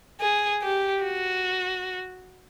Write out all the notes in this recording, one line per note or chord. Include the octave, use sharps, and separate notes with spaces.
G#4
G4
F#4